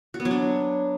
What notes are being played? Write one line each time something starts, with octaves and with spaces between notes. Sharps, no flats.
F#4
B3
F#3
D4